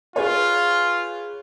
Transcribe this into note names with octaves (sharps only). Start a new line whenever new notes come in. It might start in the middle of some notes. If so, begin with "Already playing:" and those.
F4 G#4 B4 C#5